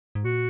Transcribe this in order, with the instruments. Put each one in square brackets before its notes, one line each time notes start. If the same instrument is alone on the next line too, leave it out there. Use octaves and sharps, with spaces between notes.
[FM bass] G#2
[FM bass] A#2 [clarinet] F#4